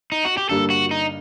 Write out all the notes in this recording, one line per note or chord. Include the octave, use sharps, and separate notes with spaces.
D#4
F#4
G4
G2 D3 G3 A#3 D4 A4
F#4
D#4